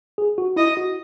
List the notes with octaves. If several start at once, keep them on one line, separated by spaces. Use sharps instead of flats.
G#4
F#4
E4 D#5
F#4